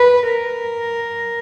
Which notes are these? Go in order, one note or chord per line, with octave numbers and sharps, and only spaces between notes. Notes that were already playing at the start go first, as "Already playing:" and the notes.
Already playing: B4
A#4